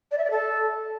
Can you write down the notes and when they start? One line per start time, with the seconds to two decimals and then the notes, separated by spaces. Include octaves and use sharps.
0.12 D5
0.18 E5
0.24 D5
0.31 A4